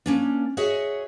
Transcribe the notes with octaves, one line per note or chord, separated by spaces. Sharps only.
A#3 C#4 D4
F#4 G#4 C#5 D#5 E5